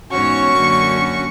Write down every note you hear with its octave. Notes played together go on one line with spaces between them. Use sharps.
E2 G#2 C#4 F#4 C#5 C#6
F#2 D3 A#3